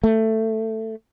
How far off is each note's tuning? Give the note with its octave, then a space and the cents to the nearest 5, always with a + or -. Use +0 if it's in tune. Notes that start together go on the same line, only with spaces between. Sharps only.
A3 +10